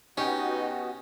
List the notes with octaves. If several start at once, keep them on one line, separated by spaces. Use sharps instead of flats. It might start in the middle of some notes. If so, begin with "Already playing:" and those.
B2 B3 C#4 D#4 F#4 G4 G5